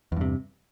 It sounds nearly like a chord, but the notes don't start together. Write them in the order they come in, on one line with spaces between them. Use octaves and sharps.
E2 G2 C3